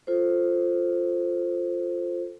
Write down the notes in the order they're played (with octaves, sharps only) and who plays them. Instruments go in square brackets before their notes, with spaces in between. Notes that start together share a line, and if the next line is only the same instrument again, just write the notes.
[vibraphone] F4 A4 C5